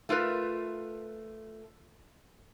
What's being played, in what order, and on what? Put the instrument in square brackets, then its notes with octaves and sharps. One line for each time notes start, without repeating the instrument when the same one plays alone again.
[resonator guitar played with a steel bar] A3 F4 A#4 B4